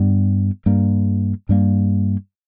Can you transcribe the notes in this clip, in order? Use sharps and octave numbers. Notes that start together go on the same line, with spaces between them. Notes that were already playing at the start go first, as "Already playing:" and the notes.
Already playing: G2 G3 B3
G2 G3 A#3
G2 G3 A#3